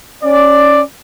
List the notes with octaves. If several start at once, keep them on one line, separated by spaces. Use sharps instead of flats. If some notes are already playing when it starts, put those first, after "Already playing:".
C#4 D5